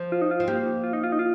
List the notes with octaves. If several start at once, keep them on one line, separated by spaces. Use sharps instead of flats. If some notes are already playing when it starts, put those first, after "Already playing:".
Already playing: F3
F4
D#4
F4
C4
A#3 G4
F4
D#4
F4
D#4
F4